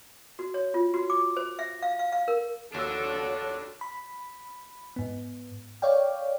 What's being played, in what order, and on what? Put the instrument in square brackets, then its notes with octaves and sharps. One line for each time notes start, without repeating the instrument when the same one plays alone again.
[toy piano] F#4
C#5
F4
F#4
D6
C5
E5
F5
F5
F5
A#4
[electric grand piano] D#2 E6 [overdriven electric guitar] D4 [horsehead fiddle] F#4 A4 [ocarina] C#5
[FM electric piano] B5
G#2 B3
C#5 D5 F5 G5